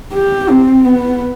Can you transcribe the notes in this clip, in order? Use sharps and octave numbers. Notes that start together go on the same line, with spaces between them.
G4
C4
B3